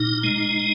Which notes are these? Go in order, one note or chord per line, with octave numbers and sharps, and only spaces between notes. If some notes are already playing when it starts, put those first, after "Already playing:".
Already playing: A#2 D#4
G#3